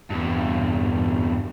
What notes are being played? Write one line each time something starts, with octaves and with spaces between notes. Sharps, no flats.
E2 G2